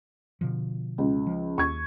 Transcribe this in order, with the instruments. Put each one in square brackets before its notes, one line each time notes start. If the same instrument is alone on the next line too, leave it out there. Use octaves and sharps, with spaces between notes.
[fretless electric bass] B2 D3 F3
[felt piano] C#2
[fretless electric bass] F3
[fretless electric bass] D#2 [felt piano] C#6 G#6